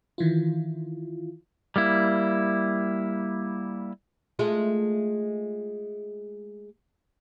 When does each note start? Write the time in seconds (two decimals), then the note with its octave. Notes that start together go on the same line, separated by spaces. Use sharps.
0.18 D#3 E3 E4 F4
1.76 G3 A#3 E4
4.39 G#3 A3 F4